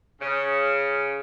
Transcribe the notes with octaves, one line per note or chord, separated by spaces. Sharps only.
C#3